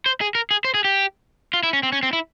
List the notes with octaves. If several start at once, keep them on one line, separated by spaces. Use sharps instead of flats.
C5
G#4
A#4
G#4
C5
G#4
G4
F4
E4
C#4
C4
C#4
C4
E4